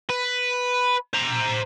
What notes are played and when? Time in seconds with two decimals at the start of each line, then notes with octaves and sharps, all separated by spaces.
0.10 B4
1.14 C5 A#5